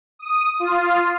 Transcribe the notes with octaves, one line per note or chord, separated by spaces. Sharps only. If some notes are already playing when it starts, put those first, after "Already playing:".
D#6
F4